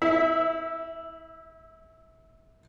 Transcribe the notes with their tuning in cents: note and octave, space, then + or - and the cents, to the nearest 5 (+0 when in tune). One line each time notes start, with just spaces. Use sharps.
E4 -30 E5 +0